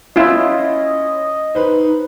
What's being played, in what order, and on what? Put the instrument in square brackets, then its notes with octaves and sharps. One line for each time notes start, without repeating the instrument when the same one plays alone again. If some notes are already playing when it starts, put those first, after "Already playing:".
[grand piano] C#4 [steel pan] E4 F4 [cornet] D#5
[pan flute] D#4 [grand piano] B4 C5